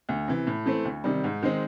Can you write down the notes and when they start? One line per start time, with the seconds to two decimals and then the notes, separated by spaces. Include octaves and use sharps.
0.09 D2
0.28 C3 E3
0.47 A2
0.66 E3 A3 C4
0.85 D2
1.04 C3 D#3 G3
1.24 G#2
1.43 D#3 G#3 C4